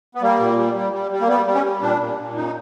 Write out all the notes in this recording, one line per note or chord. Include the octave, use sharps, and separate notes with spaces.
B3
G3 A#3
A#2
G3
G3
G3
G3
A#3
G3 B3
G3
C#4
G3
A#2 D4
A#2
A#2
F#2 D#4